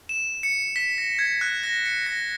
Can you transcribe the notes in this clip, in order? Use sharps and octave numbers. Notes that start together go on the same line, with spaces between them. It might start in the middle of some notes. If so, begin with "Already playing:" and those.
E7
C#7
B6
A#6
G#6
F#6
A#6
C#7
A#6